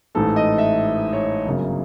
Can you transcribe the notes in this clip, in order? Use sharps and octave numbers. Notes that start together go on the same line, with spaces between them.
A1 G#2 E3 A3 A4
D#5
E5
C#5
G1 F#2 C#3 F#3 A#3